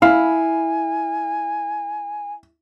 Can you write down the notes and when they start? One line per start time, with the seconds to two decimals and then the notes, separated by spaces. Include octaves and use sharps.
0.02 E4 F5 G#5